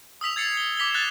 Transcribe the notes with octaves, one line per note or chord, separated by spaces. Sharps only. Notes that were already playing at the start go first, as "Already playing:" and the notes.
D#6 E6 B6 F7
G#6 A6 C7 C#7
G7
D6 B6 F7 G7
F#6 A6 F7